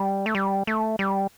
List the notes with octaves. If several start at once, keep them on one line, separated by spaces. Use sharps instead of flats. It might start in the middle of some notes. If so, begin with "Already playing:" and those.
Already playing: G3
A3
G3
A3
G3